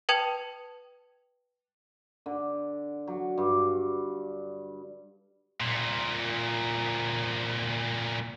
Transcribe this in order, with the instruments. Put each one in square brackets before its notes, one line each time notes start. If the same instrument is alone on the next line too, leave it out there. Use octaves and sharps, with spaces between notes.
[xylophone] B4 G5 A5 D#6 G#6 F7
[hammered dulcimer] D3
F#3
G2
[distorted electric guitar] C2 A#2